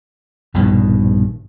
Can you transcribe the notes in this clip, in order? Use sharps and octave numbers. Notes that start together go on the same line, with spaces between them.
A#1 G2 B2 D#3